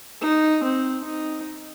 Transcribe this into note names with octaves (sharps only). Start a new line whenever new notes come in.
D#4
C4
D#4